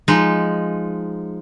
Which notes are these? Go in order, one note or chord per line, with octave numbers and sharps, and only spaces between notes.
F3 G#3 D#4